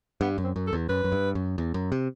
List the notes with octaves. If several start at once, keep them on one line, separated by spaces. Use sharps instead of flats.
G2 B3
F#2
C4
F#2
A4
E2
F#2 B4
F#2
G2
F#2
E2
F#2
C3